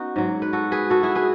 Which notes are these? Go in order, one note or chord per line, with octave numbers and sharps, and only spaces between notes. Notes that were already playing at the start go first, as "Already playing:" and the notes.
Already playing: B3 C#4 D#4 F#4
G#2 F#3
B4
F#4 A4
G#4 B4
F#4 A4
E4 G#4
G#4 B4